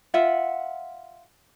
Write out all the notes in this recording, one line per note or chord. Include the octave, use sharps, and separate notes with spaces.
F4 E5 F#5